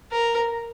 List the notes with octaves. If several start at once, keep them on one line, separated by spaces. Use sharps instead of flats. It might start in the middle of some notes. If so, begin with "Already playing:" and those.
A#4